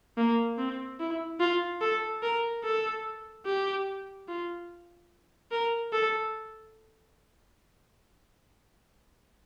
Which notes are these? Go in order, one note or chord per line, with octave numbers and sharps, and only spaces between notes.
A#3
C4
E4
F4
A4
A#4
A4
G4
F4
A#4
A4